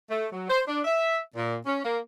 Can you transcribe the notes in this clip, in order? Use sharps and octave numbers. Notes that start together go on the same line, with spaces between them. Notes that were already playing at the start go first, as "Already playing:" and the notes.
A3
F#3
C5
D4
E5
A#2
C#4
A#3